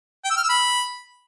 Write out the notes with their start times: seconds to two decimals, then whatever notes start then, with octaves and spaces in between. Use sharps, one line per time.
0.24 G5
0.31 E6
0.37 F6
0.43 E6
0.49 B5